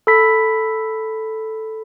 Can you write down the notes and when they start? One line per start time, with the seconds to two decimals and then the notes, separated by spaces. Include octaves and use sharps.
0.07 A4 B5 B6